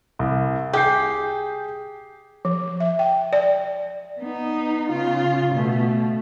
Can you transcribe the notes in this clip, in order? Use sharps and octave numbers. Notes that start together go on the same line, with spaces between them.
C2
G4 G#4 G6 C7
F3
E5
G5
D5
B3 D#4
C#3 F4
B2 A3